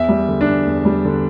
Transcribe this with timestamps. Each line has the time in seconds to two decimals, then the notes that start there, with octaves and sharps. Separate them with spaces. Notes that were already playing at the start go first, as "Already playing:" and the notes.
Already playing: E2 E5
0.09 G3
0.28 D3
0.41 D4
0.47 E2
0.66 E2
0.85 G3
1.05 D3